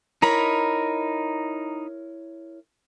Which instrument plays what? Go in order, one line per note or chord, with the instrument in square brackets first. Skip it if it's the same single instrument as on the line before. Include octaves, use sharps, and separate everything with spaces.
[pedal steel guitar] D#4 A#5 B5 [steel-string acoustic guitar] E4 A#4 C#5